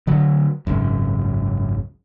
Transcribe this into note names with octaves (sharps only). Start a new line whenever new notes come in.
D3 F#3
G#1 C#2 F#2